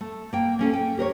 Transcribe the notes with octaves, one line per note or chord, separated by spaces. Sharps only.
A3
A#3 G5
A#3 C#4 A4
G5
G4 A#4 C5 C#5